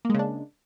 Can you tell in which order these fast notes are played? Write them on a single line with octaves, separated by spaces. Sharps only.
A#3 G#3 C#3 D4